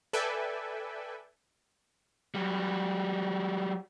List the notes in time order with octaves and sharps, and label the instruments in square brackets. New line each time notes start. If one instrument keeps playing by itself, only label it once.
[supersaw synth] A4 B4 D5 E5 G5 G#5
[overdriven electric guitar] F#3 G3